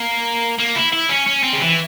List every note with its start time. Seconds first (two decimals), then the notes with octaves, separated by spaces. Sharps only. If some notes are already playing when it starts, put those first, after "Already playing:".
Already playing: A#3
0.58 A#3
0.75 E4
0.92 E4
1.09 C#4
1.27 C#4
1.43 C4
1.53 C#3
1.61 E3